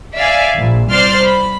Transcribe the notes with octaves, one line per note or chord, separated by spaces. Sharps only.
D5 E5 F5 G#5
A#1
C2 C5 D5 C6 F6 C7
B5